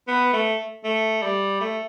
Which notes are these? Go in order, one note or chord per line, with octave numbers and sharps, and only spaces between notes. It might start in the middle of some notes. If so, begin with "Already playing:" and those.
B3
A3
A3
G3
A3